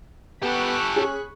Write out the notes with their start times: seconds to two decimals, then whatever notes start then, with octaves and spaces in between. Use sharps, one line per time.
0.43 B3 G4 A4 B5 C#6 F#6
0.96 C#4 G#4